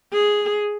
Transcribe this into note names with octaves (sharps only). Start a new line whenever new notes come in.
G#4